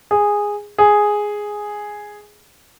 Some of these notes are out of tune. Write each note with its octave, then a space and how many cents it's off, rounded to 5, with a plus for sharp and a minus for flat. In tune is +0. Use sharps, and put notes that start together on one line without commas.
G#4 -10
G#4 +0